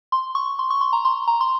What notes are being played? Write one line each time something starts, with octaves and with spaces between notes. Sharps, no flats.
C6
C#6
C6
C#6
C6
A#5
C6
A#5
C6